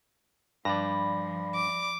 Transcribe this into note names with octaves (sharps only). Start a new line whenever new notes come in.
G2 F3 D5 B5 A#6
D6